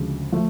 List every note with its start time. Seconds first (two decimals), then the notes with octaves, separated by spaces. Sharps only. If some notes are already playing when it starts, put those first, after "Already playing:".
Already playing: D2 C#3 F3 G#3
0.32 F3 A3